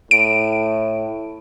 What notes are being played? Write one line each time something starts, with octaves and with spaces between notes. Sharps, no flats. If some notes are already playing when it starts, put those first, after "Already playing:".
A2 D7